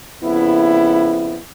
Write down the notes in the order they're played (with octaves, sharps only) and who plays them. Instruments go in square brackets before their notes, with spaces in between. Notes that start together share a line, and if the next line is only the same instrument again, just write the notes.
[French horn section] F2 C#3 B3 E4